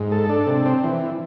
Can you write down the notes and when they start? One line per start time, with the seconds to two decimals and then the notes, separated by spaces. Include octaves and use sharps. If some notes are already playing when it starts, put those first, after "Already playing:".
Already playing: G#2
0.12 A4
0.29 D4
0.47 C3
0.65 C4
0.84 E3